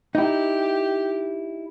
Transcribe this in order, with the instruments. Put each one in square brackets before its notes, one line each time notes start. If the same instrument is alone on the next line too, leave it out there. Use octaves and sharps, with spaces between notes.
[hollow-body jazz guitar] D#4 E4 [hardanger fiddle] G4